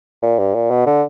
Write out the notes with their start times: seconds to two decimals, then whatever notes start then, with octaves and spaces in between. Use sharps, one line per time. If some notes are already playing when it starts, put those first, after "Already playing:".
0.22 A#2
0.39 G2
0.54 A#2
0.70 B2
0.86 D3